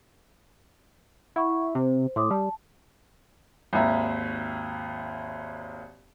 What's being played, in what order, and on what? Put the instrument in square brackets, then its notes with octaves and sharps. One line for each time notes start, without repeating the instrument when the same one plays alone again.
[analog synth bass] E4 [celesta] F#5 C#6
[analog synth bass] C3 [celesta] C5
[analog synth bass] A2 [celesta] C6 D6 D#6
[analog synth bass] G3 [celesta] A5
[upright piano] G#1 D#2 E5 A#5